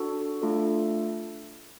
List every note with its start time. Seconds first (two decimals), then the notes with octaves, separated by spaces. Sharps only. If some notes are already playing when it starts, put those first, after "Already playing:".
Already playing: D4 F#4 A4
0.42 A3 D4 F4 A4